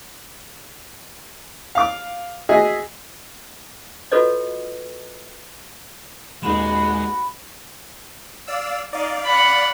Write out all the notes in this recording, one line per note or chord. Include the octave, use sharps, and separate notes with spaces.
F5 D6
F#4 G#4 D#5 E5
F4 F#4 A4 B4 C#5 D#5
D#1 G#3 D#4 F#4 B5 E7
D5 F5 E6
D#4 D5 F5
F#5 B5